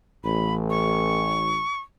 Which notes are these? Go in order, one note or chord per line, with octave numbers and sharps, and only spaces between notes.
A1 B5
C#6